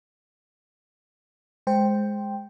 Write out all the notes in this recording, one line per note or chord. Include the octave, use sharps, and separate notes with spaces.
G#3 C5 G5